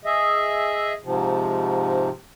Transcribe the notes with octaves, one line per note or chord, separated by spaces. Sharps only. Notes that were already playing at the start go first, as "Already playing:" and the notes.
G#4 D#5 E5
G#2 C3 F3